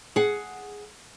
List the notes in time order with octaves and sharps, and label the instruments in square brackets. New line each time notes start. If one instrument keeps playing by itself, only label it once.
[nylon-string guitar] G#4 F#5